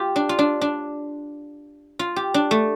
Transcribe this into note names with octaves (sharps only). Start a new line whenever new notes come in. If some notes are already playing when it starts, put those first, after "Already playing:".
Already playing: F4 G4
D4
F4
D4
D4
F4
G4
D4
A3